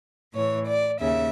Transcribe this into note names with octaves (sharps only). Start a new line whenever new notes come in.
A2 E3 C#5
D5
D#2 C#3 E5